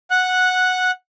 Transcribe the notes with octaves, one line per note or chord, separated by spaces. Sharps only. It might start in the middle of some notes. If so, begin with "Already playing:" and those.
F#5 F#6